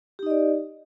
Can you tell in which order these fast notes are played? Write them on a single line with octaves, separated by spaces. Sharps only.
G4 D#4 D#5 D5